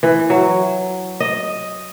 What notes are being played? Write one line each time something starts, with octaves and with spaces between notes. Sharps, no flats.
E3
F#3
D#5